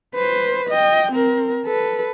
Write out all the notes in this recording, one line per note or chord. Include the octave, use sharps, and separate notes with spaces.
B4 C5
D#5 G5
C4 A#4
A4 B4